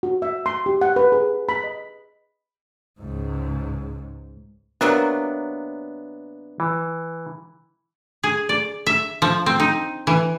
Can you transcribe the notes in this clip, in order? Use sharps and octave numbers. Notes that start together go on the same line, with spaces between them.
F#4
E5
C6
G4
F#5
B4
G#4
B5
D#5
C#2 G#2
C3 F#3 A#3 B3 D4
E3
G#4
D5
E5
F3
C4
D#4
E3